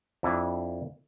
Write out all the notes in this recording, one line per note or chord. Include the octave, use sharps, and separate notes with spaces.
F2 D4 E4